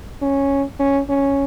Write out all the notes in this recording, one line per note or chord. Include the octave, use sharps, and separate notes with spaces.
C#4
C#4
C#4